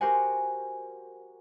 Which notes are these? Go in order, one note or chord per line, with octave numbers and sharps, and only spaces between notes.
F#4 G4 A#4 C5 F#5 G#5